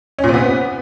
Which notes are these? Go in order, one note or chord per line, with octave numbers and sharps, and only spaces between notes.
C#4
A#2
C3
B3